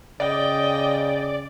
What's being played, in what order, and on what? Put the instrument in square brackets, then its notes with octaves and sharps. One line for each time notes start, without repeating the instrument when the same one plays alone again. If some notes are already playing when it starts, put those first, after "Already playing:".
[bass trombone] C#3 [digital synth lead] D5 [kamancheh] D#5 G5